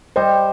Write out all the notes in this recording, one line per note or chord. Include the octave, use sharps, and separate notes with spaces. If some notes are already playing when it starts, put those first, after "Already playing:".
G3 C5 D#5